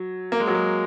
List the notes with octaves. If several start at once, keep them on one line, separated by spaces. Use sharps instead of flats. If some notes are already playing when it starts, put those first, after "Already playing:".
Already playing: F#3
A#3
G#3
F#3
G#3